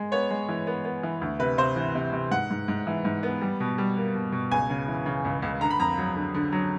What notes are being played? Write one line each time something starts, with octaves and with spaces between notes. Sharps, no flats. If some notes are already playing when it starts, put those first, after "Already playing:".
Already playing: G#3
B3 C#5
G#3
E3
B3
B3
E3
D2
C3 B4
C3 C5
E3
C3
C3
G#2 F#5
G#2
G#2
E3
G#2
B3
G3
B2
G3
A#3
B2
B2
C#2 G#5
C#3
E3
C#3
C#2
C#2
D3 A#5
B5
F2 A#5
F#3
D3
D3
F#3